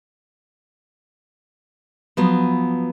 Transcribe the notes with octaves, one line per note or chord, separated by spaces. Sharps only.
F3 F#3 B3